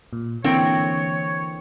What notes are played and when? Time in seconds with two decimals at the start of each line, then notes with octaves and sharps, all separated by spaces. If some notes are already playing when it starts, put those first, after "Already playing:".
0.13 A#2
0.44 D3 E3 A#3 C4 C#5 G5